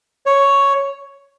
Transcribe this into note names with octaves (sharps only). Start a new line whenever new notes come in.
C#5